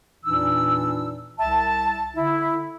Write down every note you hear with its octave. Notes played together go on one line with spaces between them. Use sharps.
E2 A#2 E3 D4 D#4 E6
C2 E5 A5
D3 E4